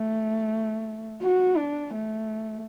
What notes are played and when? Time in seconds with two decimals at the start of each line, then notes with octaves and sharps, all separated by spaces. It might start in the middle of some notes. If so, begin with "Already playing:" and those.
Already playing: A3
1.22 F#4
1.57 D4
1.94 A3